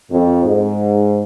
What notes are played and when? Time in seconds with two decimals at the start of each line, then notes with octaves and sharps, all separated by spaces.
0.12 F2
0.45 G#2